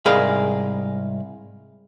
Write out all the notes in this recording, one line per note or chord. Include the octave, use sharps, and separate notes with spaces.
C2 G#2 G#4 A#4 F5 B5